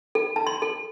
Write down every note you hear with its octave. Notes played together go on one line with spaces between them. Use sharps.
A4
A5
C6
A4